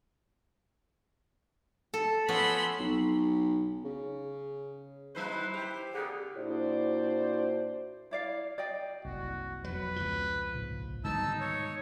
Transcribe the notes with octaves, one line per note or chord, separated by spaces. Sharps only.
A4
F3 B3 C#4 B5 C6 E6
B1
C#3
F#3 D#4 E4 B4 C5
G4
F2 A#2 D3 G#4
A#2 D4 E4 F#4 C5 D5
E4 D5 F5
D5 D#5 G5
F#1 C2 F#4
F2 B2 F#3 B4
C#2 F3
A#1 G#2 C#3
G#2 B2 D3 D#3 G3 D#4 A5 E6
C#5